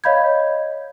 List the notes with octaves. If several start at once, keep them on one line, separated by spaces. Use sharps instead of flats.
C#5 D#5 F5 B5 G6 G#6